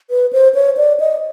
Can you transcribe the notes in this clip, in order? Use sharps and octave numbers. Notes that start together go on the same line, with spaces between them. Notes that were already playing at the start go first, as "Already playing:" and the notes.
B4
C5
C#5
D5
D#5